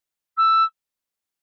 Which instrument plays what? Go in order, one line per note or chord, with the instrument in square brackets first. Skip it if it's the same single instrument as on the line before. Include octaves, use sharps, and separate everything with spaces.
[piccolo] E6